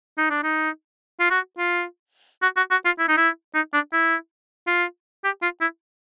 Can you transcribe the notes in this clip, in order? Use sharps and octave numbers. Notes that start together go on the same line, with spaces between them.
D#4
D4
D#4
F4
F#4
F4
F#4
F#4
F#4
F4
E4
D#4
E4
D#4
D4
E4
F4
G4
F4
E4